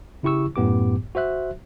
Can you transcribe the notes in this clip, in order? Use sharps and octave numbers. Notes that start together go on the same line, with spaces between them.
C#3 E4 G4 C#6 E6
F#2 A2 B3 G4 D6
F#4 C5 E5 F#6